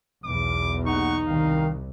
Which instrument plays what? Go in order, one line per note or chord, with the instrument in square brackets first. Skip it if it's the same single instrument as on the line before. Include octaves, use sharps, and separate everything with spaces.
[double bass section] B1 E2 [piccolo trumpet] D6
[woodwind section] D#2 F#5 [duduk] D#4 [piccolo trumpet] C#6
[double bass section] C2 [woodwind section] D#3 [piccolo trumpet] F5